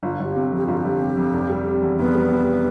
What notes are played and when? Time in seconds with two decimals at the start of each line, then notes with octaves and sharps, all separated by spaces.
0.03 G1 F4
0.20 G1
0.25 G4
0.36 C3
0.52 F2 G4
0.66 G1 F4
0.77 G4
0.85 G1
1.00 C3
1.17 F2
1.33 F1
1.50 G3
1.67 C3
1.83 E2
1.99 F1 B3
2.15 G3
2.32 C3